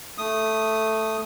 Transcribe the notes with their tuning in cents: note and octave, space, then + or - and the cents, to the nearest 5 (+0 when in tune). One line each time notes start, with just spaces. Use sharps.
A3 +0 D#6 +0